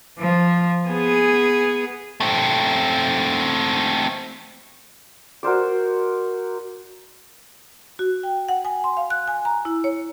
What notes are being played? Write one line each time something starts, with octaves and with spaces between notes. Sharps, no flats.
F3
B3 G#4
A3 C4
F#4 A#4 C5 D5
F#4
G5
F#5
G#5
C6
F5
F#6
G#5
A#5
E4
C#5